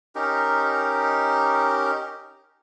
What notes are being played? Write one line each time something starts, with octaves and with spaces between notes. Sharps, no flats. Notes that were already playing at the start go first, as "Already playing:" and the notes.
C#4 D#4 G4 A#4